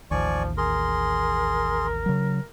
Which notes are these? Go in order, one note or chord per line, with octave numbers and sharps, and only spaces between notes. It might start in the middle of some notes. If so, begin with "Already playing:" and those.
A1 D#2 F3 D5 G#5 C#6
G#4 A#4 C6
C#3 F#3